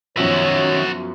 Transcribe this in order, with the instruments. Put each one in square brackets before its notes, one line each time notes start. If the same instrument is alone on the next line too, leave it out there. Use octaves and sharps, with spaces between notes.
[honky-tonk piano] F#2 B2 F3 [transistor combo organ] D#3 C#4 [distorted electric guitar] F#4 E5 [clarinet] C#5